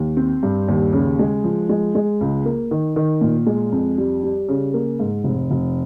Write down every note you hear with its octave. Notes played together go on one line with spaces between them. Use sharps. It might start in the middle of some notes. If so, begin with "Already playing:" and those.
Already playing: D#2
C4
G2
D#2
C#3
G#3
F3
G#3
G#3
C#2
A#3
D#3
D#3
A#2
G#3
F2
G3
G3
C#3
A#3
G#2
F1
F1